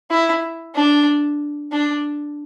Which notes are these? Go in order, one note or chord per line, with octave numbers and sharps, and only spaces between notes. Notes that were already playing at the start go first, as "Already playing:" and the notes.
E4
D4
D4